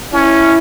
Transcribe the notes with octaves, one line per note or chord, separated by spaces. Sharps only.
C#4 E4